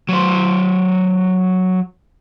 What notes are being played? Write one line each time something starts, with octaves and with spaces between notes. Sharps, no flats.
F#3 C5